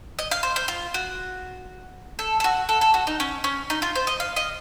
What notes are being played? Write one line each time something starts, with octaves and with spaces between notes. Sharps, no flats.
D#5
F5
C5
C5
F4
F#4
A4
A4
F#4
A4
A4
F#4
D#4
C#4
C#4
D#4
F4
C5
D#5
F5
D#5